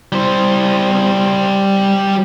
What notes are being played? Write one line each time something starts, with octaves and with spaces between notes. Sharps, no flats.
G3 C5